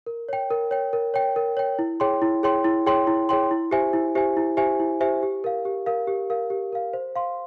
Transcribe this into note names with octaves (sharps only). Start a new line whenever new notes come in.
A#4
C#5 G5
A#4
C#5 G5
A#4
C#5 G5
A#4
C#5 G5
E4
G#4 C#5 G5 C6
E4
G#4 C#5 G5 C6
E4
G#4 C#5 G5 C6
E4
G#4 C#5 G5 C6
E4
G4 C5 E5 G#5
E4
G4 C5 E5 G#5
E4
G4 C5 E5 G#5
E4
G4 C5 E5 G#5
G4
A#4 F5
G4
A#4 F5
G4
A#4 F5
G4
A#4 F5
C5
F5 C6